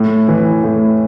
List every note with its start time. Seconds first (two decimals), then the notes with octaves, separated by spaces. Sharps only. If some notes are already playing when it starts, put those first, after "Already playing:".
Already playing: A2
0.28 E3
0.64 A2